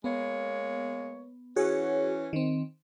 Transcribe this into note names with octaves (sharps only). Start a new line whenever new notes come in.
G#3 A#3 B3 C#5
E3 C#4 F#4 G#4 C#5
D#3 C4